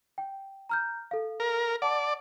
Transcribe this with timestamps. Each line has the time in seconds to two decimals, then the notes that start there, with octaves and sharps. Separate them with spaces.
0.18 G5
0.69 A#5 F6 G6
1.11 A4 F5
1.40 A#4
1.82 D5 F#5 A5 D6